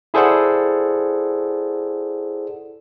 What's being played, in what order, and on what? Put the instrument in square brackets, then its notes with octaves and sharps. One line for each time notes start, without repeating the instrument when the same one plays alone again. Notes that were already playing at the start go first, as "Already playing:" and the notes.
[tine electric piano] E4 G#4 A4 C5 D5 F#5